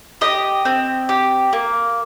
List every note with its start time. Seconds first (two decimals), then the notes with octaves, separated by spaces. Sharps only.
0.21 G4 D#5
0.65 C4
1.09 G4
1.53 A#3